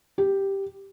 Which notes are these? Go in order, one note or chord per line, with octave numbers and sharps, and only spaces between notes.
G4